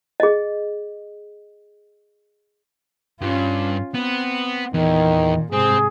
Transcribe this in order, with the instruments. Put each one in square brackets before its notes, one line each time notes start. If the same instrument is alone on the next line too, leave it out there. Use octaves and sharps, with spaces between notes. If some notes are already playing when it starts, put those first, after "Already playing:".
[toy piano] G#4 D#5
[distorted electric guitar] G2 [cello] C#4 F4
[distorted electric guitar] B3 [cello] C4
[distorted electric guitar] E2 [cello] A#2 [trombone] D#3
[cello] G#2 C3 [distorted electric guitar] C4 [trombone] G#4